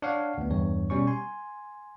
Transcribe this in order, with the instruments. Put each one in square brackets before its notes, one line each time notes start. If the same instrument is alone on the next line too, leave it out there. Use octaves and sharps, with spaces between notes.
[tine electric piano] D4 C#5 F5 F#5
D2 B3
E2 G2 C#5
B2 G3 C#4 C#6
G#5 C6